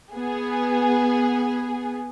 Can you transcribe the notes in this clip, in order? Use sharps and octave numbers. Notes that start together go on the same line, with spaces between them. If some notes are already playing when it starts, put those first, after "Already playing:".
B3 G#4